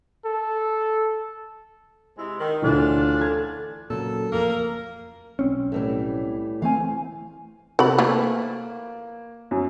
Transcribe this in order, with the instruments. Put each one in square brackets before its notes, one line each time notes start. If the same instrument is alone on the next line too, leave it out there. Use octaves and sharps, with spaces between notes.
[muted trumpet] A4
[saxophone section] C3 G#3 E4
D#3
[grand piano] D2 D3 E3 [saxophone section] C#4 D4 F4
[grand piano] A4 G#6
[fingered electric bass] A#2 C#3 F#3 [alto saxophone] A4
[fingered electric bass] A1 F2 [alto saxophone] A#3 [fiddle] A#4
[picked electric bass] B1 C4 C#4
[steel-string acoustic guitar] A2 E3 G3
[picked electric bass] E3 A3 C4 [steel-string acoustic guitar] F5 G#5
[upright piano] C3 A4 [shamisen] F#4 B5
[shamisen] E3 F3 A3 [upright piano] A#3
[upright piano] F#2 F#3